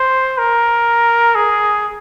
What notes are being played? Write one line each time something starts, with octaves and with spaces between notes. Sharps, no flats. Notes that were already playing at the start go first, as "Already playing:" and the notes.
Already playing: C5
A#4
G#4